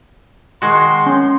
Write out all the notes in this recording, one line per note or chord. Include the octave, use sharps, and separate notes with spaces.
D#3 G#3 F#4 C6
C#4